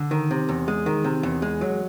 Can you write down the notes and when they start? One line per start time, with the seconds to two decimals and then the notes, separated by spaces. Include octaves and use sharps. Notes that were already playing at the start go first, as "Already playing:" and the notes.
Already playing: D3
0.11 D#3
0.31 C3
0.49 E2
0.68 G#3
0.86 D#3
1.04 C3
1.23 E2
1.42 G#3
1.61 F#3